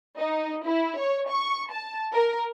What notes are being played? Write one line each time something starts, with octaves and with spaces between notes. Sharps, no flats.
D#4
E4
C#5
C#6
A5
A#4